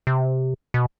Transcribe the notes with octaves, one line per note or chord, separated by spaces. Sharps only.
C3
B2